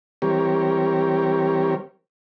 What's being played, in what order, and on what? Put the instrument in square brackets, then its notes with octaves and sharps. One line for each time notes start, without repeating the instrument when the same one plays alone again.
[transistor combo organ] E3 G3 C4 G4 A#4 C#5